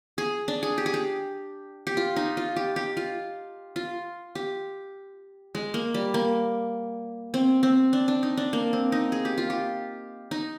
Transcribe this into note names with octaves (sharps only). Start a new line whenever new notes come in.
G#4
D4
G#4
G4
G#4
G4
G4
F4
D#4
F4
G4
G4
F4
F4
G4
G#3
A#3
G3
A#3
C4
C4
D4
D4
D#4
D4
A#3
C4
D#4
G#4
G4
F4
G4
D#4